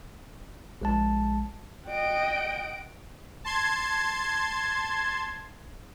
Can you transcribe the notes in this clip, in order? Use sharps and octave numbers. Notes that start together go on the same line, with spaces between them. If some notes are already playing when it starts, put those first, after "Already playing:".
A#1 G#3 A5
D#5 F#5 G5 D7
A5 C6 G#6